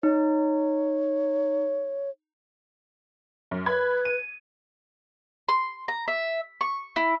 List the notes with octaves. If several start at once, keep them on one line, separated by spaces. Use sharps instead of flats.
D#4 C#5
F#2
B4 B5 G#6
D#7
C6
A#5
E5
C#6
E4